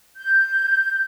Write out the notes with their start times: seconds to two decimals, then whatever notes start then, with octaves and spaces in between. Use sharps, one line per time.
0.17 G6